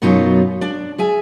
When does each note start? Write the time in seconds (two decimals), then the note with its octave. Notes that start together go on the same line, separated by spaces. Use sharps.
0.02 F#2 B2 F#3 B3 D#4 F4
0.61 D4 D5
0.98 G#4 E5 G#5